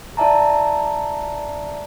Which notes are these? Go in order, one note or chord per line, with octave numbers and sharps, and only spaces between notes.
E4 D5 E5 A5 A#5